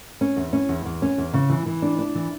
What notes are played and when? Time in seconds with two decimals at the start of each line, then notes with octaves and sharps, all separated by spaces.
0.21 C#4
0.36 E2
0.53 C#4
0.69 E2
0.85 E2
1.02 C#4
1.18 E2
1.34 C#3
1.50 E3
1.66 E3
1.82 D4
1.99 D4
2.15 E3